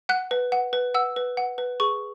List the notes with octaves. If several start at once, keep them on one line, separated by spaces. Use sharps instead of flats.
F#5 F#6
B4
F#5
B4
F#5 E6
B4
F#5
B4
G#4 C#6